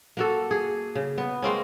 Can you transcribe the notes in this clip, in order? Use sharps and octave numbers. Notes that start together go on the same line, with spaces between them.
A#3 F#4 A4
G#4
C#3
B3
G#3 A#3 C4 C#4